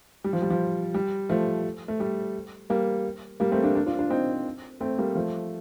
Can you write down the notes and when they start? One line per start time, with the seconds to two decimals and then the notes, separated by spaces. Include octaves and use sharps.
0.24 G3
0.33 F3
0.42 G3
0.50 F3
0.94 G3
1.29 F3 A3
1.88 A3
2.00 G3
2.70 G3 A#3
3.40 G3 A#3
3.52 A3 C4
3.64 A#3 D4
3.75 A#3 D4
3.86 D4 F4
3.99 D4 F4
4.10 C4 D#4
4.80 A3 C4
4.98 G3 A#3
5.15 F3 A3